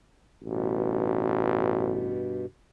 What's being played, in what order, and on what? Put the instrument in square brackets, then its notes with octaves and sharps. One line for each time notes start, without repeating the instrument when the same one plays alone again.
[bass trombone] A1 [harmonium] G2 B2